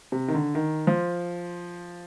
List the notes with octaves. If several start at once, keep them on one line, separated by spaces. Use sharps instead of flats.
C3
D#3
D3
D#3
F3